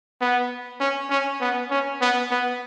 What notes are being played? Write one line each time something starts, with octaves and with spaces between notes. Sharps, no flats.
B3
C#4
C#4
B3
C#4
B3
B3